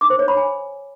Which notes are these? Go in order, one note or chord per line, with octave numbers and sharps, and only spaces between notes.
D6
C5
C#5
B5
G#5